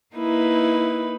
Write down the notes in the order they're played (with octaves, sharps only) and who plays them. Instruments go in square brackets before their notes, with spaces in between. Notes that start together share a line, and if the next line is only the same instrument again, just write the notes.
[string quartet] A#3 D#4 B4 [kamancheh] E4